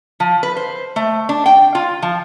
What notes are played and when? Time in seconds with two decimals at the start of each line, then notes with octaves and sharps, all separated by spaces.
0.20 F3
0.43 B4
0.57 C5
0.96 A3
1.29 D4
1.46 G5
1.75 F4
2.02 F3